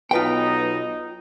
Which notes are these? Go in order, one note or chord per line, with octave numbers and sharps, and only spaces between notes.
B1 B3 D#4 F4 B4 G5